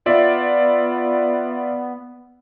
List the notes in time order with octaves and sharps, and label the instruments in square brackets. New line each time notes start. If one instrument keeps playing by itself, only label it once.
[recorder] B3 [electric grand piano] F4 D5 E5